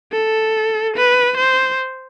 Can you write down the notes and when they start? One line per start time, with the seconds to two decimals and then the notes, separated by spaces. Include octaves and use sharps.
0.12 A4
0.96 B4
1.37 C5